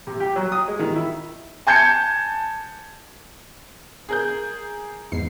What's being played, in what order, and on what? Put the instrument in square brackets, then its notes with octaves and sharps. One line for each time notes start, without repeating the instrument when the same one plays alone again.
[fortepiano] C3
G4
F#3
D#6
G#3
D#3
E4
[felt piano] G#5 A5 G6 G#6 C#7
[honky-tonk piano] G#4 A#4 G6
[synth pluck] E2 G#2 C7